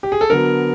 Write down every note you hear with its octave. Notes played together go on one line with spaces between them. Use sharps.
G4
G#4
A4
D3 F#3 B3 A#4